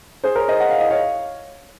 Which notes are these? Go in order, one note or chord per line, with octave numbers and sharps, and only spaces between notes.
G#4 C5
A#4 C#5
C5 D#5
F#5
F5
D#5
C#5 F5